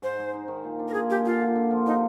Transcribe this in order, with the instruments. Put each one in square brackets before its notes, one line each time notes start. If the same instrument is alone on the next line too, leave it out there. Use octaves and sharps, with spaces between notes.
[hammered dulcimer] G#2 [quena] C5
[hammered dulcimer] G#3
D#4
D#3
A#2
D4
[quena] A#4
[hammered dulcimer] A#2 [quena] G#4
[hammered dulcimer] G#3 [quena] G4
[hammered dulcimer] D3 [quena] F4
[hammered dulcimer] A#3
D3
F3
[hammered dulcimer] C3 [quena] D#4